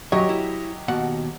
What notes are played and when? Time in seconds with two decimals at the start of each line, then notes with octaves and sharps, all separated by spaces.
0.12 F#2 F#3 G4 C#5 D#5
0.29 E4
0.88 D#2 B2 F#5